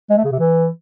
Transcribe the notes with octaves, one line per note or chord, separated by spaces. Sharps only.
G#3
A3
C#3
C3
E3